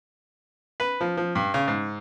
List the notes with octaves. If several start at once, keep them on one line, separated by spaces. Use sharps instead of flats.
B4
F3
F3
G2
C#3
G#2